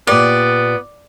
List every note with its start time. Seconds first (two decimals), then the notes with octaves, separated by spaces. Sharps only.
0.07 A#2 B3 G4 D5 F5